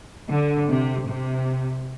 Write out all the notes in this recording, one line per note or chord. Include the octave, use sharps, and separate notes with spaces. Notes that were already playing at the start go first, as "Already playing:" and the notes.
D3
C3
C3